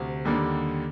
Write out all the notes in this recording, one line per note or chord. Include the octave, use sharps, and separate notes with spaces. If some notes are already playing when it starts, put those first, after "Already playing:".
Already playing: D2 C3
D#2 D3 G3 A#3